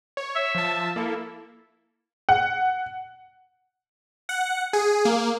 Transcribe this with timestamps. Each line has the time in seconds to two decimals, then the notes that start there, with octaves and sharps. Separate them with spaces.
0.17 C#5
0.36 E5
0.55 F3 A5
0.96 A#3 E4 A4
2.29 F#5
4.29 F#5
4.73 G#4
5.05 A#3